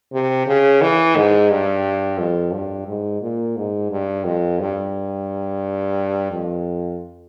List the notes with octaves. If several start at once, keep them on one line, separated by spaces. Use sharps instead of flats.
C3
C#3
E3
G#2
G2
F2
G2
G#2
A#2
G#2
G2
F2
G2
F2